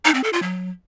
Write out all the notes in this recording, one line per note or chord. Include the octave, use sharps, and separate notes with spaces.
D#4
C4
A4
F4
F#3